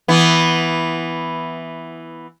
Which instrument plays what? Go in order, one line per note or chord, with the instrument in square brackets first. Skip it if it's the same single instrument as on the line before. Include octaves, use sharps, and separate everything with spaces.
[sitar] E3 B3